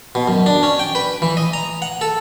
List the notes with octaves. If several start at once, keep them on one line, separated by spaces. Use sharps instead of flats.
B2
F#2
D4
C#4
G5
B4
E3
D#5
A#5
F#5
A4